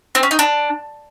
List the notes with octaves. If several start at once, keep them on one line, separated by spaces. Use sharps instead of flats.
C4
C#4
D#4
D4